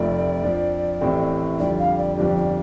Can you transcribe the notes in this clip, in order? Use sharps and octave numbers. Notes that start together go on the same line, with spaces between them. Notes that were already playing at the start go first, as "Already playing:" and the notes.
Already playing: F1 F2 C3 A3 D5
F2 F3 D4
A1 A2 A3 C4 G4
F2 D3 G3 D4 D5
F5
D5
G1 F2 F3 D4 G4 D5
D5